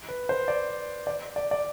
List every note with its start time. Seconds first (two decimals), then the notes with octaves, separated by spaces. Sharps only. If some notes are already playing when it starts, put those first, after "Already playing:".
0.09 B4
0.29 C5
0.48 D5
1.07 D5
1.36 D5
1.51 D5